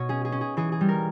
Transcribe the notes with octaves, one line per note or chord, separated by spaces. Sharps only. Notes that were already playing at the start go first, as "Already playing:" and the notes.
Already playing: B2 C#5 D#5
C#4 G#4
G#4
C#4
G#4
E3 G#4
G#4
G3
A#4